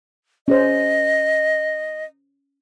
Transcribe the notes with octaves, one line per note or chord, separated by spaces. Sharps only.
C#4 G#4 C5 D#5